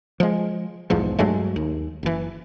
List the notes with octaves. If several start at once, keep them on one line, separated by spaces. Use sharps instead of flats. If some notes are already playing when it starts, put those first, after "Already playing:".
F3 G#3
B1 E2 G#2 F3
G2 F#3 G#3 A3
D#2
F#1 E3